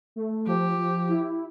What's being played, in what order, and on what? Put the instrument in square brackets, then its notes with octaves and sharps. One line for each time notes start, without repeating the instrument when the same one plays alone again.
[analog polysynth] A3
[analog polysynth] F3 [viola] G4
[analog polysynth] F3
E4